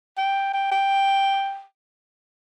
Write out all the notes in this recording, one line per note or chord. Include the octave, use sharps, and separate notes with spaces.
G5
G5
G5